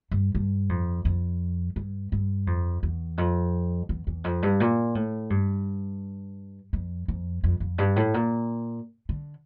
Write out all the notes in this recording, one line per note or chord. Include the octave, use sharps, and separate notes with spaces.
G2
G2
F2
F2
G2
G2
F2
E2
F2
E2
E2
F2
G2
A#2
A2
G2
F2
F2
F2
F2
G2
A2
A#2
D3